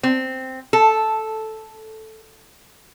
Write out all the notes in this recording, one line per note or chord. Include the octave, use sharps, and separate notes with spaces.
C4
A4